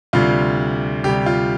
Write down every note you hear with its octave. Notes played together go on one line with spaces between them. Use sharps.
D2 C3 G3 F4
D2 C3 G3 G4
F4